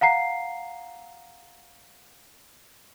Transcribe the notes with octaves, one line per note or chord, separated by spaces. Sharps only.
F5 F#5 A#5 C7